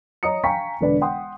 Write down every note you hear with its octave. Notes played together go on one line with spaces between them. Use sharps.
C#5 D#5 A#5 D#6 C#7
F5 G5 G#5 A#5 C#6 B6
E1 D3 B4 D5
F#5 G5 C6 D#6